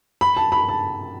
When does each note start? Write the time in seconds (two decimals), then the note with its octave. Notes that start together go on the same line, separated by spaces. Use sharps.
0.21 B5
0.37 A5
0.52 B5
0.69 A5